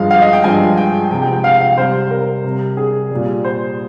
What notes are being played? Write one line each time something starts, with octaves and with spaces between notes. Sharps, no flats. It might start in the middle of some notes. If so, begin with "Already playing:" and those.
Already playing: G2 F3 G#3 F5
F5
D#5
G5
G2 F3 G#3 G#5
G5
C3 F3 G#3 G5
G5
G5
F5
F5
C3 G3 C5
A#4
C3 G3
G#4
A#2 G3
C5